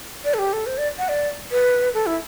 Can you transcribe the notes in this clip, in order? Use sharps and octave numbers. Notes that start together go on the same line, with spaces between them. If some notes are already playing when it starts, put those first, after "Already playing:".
D5
A4
G4
A4
C5
D5
F#5
D5
B4
A4
E4